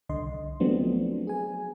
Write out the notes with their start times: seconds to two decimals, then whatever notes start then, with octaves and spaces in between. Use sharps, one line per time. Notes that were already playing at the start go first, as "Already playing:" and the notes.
0.09 C2 D3 D#5 C6
0.60 F3 F#3 A3 B3 C4 D4
1.27 G#4 G#5